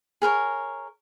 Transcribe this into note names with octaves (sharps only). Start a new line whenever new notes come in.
G#4 A#4 B4 C#5